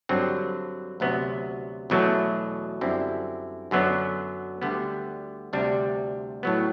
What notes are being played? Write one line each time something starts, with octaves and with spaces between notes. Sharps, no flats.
G2 D3 F#3 C4
D2 C3 F#3 B3
E2 B2 F#3 A3
F#2 D3 G3 C4 E4
F#2 D3 F#3 B3
D2 D3 G3 B3
D2 C3 G3 D4
A2 F#3 B3